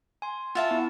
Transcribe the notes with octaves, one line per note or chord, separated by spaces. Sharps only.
G#5 C6
F4 E5 F#5 A5
B3 E4